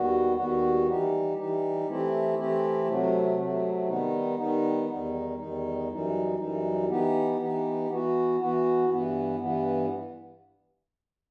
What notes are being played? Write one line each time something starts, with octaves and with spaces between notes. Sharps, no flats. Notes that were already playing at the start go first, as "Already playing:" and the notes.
Already playing: D#2 D#3 G3 B3 F#4
D#2 D#3 G3 B3 F#4
E3 G3 D#4 G4
E3 G3 D#4 G4
E3 A3 C4 E4 G4
E3 A3 C4 E4 G4
C3 F#3 A3
C3 F#3 A3
D#3 G3 B3 D#4
D#3 G3 B3 D#4
E2 D#3 G3 D#4
E2 D#3 G3 D#4
F#2 E3 G3 D#4
F#2 E3 G3 D#4
E3 B3 D#4 G4
E3 B3 D#4 G4
E3 B3 F#4
E3 B3 F#4
G2 E3 B3
G2 E3 B3